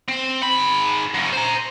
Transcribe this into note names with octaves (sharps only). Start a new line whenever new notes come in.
C4
G#2 B5
F#2 C#3
C5 A#5